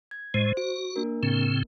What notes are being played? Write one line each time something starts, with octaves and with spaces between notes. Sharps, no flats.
G#6
A2 G#3 C5
F#4 D7
A#3 D4 A#4
A2 C#3 C4